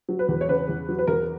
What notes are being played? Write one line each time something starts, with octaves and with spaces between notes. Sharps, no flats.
F#3
B4
E2
C#5
C#3 B4
E2
F#3
B4
E2 A#4